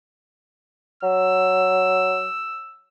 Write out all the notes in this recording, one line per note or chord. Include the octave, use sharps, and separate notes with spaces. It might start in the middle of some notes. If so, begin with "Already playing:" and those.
F#3 E6